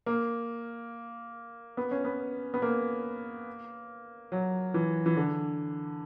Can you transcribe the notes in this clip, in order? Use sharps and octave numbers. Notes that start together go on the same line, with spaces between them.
A#3
B3
C#4
B3
B3
A#3
F#3
E3
E3
D3